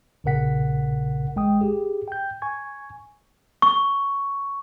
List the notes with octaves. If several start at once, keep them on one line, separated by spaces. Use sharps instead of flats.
A#1 A#2 C#3 A#4 F#5 B6
A1 G#3 G5 D#6
G4 G#4
G5 G6
G#5 C#6 G#6
C#6